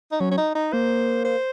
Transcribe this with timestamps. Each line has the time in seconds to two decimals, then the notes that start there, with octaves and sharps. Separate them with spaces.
0.12 D#4
0.20 F#3 C#4
0.31 C#4
0.38 D#4
0.55 D#4
0.73 A#3 C5
1.25 C5